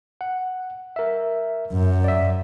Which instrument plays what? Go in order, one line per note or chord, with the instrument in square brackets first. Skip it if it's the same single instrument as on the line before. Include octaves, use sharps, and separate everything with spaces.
[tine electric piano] F#5
A#4 E5
[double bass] F#2
[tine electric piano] D5 E5